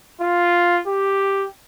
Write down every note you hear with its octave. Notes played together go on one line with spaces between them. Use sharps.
F4
G4